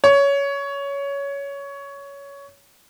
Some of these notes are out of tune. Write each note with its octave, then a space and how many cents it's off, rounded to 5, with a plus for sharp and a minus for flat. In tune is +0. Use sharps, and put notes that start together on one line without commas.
C#5 +15